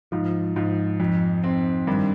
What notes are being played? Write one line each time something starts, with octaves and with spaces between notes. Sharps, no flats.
G#2 F3
G#2 F3
F2
C4
G2 D#3